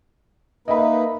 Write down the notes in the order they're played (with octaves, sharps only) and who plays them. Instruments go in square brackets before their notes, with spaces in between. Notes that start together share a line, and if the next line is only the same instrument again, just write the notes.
[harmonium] A#3 D#4 B4 [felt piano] D#5 E5 B5